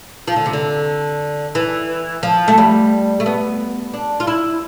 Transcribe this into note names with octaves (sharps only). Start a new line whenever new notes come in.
F3
D3
C3
D3
E3
F3
A3
G3
A3
B3
D4
F4
E4